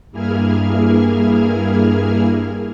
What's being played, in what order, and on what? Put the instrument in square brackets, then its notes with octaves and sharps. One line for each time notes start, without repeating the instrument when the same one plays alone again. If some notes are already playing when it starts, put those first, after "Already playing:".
[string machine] G2 A#3 E4 G#4 F6 G#6